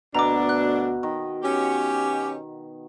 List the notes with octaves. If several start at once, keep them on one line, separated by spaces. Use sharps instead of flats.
D2 B2 D4 A#5 D6
F#6
D#3
C#4 G4